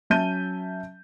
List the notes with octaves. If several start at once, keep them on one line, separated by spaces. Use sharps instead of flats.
F#3 C#4 E5 A5 G6 D#7